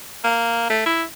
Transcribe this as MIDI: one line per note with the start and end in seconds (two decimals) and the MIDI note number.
0.24 0.69 58
0.70 0.82 57
0.86 1.03 64